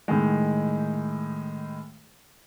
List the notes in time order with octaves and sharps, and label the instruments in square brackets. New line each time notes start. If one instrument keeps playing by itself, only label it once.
[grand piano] A2 D#3 G#3